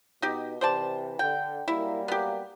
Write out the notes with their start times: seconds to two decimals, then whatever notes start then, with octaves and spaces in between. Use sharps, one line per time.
0.22 B2 D#4 G4
0.61 C3 E3 C5 D5 A5
1.19 D3 G5
1.68 F#2 G3 A#3 E4
2.08 B3 G4